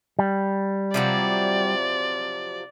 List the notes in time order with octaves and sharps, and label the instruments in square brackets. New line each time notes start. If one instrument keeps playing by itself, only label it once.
[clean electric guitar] G3
[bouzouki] C3 F3 F#3 [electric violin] D5